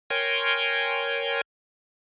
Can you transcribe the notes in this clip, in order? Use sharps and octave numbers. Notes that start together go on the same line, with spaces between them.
A#4 C#5 G5 G#5 C6